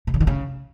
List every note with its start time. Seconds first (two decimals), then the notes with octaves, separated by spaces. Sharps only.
0.07 B2
0.14 C#3
0.20 D3
0.27 C#3